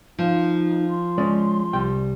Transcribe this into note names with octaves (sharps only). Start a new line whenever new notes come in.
F3 D#4
C6
G#3 C#4 D5
C2 G3 G5